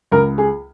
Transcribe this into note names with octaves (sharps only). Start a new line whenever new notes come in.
C#2 A#4
G#4